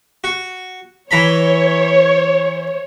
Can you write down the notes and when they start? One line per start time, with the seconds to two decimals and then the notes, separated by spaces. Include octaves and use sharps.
0.24 F#4
1.11 E3 C#5 A#5 B5